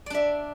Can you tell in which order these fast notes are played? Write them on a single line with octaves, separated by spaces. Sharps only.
D5 D4 E5